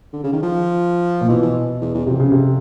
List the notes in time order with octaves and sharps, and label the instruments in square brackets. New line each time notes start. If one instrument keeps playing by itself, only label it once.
[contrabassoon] D3
C#3
D#3
F3
[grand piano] A#2
[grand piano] B2 [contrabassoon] E3
[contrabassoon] E3
E2
E2
[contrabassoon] F2 [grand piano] C3
[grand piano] C#3
C3